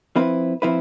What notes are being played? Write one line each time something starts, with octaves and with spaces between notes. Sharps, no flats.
F3 C4 E4 B4
F3 C4 E4 B4